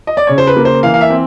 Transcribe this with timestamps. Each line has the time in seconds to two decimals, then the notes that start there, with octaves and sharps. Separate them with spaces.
0.07 D#5
0.17 D5
0.27 C#3 C#5
0.38 C5
0.47 B4
0.57 A#3
0.65 C5
0.83 E3 F5
0.94 F5
1.01 E5
1.10 C4